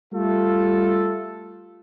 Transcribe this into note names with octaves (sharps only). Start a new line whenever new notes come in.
G3 A3 F4 A4